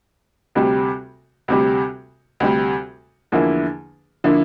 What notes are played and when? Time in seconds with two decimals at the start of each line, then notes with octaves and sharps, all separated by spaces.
0.55 D2 C3 G3
1.48 D2 C3 G3
2.40 D2 C3 G3
3.32 E2 D3 F3 A#3 E4
4.24 D3 F3 A#3 E4